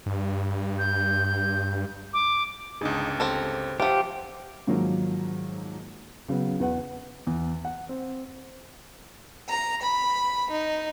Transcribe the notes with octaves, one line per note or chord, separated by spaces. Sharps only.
G2
G6
D6
G1 C#2 D4 D#4 G#4
C4 G4 A4
F3 F4 G4 C5 E5 F#5
G#2 D#3 F3 F#3 A#3
C#3 F#3 B3
E2 B4 F#5
E2
F#5
C4
A#5
B5
D#4